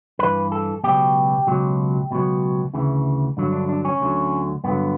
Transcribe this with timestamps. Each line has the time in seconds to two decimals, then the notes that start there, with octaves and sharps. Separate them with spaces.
0.19 G2 E3 B4
0.52 A4
0.83 C#2 B2 F#3 G4
1.47 C#2 B2 F#3
2.11 C#2 B2 F#3
2.74 D2 C#3 E3
3.37 G2 D3 F#3
3.52 D4
3.69 D4
3.85 C#4
4.00 D2 D3 F#3
4.64 G2 D3 F#3 B3